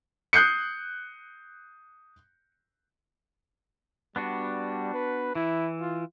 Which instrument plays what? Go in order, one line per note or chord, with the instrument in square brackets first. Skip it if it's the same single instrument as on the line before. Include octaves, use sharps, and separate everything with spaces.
[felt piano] D#6 F#6 G6 C7 C#7
[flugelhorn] G3 [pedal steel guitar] B3 D4 F#4
[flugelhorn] B4
[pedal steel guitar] E3 [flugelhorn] E4
[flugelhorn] F4